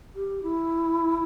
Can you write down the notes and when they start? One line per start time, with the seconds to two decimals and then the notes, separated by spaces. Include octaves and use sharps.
0.15 G4
0.43 E4